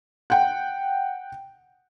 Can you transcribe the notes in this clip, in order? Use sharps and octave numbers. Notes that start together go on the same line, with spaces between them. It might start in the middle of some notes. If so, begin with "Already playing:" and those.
F#5 G5